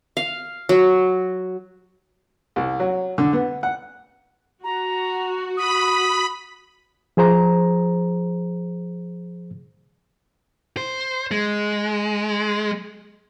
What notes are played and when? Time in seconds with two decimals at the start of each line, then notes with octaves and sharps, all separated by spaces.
0.17 F5
0.69 F#3
2.56 C2
2.80 F#3
3.18 D3
3.33 B3
3.63 F#5
4.64 F#4 A#5
5.57 B5 D#6
7.17 F3 G#4 C5 A#5
10.77 C5
11.32 G#3